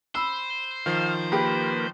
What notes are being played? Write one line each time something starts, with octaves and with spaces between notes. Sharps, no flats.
C5 B5 E6
D#3 F3 F5
A#3 G4 B4 B5